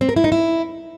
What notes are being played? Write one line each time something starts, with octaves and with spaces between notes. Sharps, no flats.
C4
A#4
E4
D#4
E4